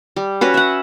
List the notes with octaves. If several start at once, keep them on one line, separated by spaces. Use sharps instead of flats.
G3
C#4 F#4 B4
E5 F#5